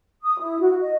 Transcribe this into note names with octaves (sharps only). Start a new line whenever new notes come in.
D#6
E4
F#4
D#5